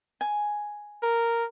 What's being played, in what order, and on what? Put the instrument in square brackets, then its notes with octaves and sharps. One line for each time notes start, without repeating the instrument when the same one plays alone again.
[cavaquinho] G#5
[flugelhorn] A#4